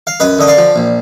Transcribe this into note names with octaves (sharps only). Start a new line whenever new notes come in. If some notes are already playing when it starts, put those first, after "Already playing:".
F5
F#2 B4 D#5
D3 D#5
D5 F5
F3
A#1